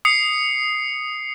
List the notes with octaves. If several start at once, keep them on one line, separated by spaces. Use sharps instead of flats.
D#6 C7 C#7